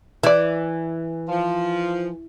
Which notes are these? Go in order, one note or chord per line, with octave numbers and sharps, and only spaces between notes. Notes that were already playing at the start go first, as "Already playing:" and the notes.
E3 E4 D5
F3